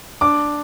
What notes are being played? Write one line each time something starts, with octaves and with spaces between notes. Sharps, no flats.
D4 D6